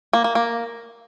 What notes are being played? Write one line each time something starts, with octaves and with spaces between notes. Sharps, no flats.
A#3
A#3
A#3